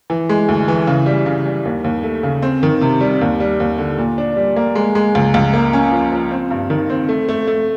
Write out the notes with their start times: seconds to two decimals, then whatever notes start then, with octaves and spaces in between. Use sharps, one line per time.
0.10 E3
0.29 G#3
0.49 D2
0.68 E3
0.87 C#3
1.06 G3
1.26 C#3
1.46 G3
1.65 D#2
1.84 D#2
2.03 A3
2.23 C#3
2.42 C4
2.63 D#3
2.81 C3
3.01 G3
3.21 D#2
3.40 G3
3.60 D#2
3.79 D3
3.98 A#2
4.18 D4
4.36 G3
4.56 A#3
4.75 G#3
4.95 G#3
5.15 C#2
5.34 C#2
5.54 A#3
5.73 C#4
5.92 F3
6.12 F3
6.31 C4
6.51 G2
6.70 D#3
6.90 C4
7.09 A3
7.29 A3
7.47 A3